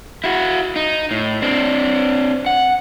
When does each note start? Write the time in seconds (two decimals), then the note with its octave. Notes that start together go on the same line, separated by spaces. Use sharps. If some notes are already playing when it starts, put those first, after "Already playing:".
0.24 E4 F#4
0.76 D#4
1.11 A2
1.42 C4 D4
2.46 F#5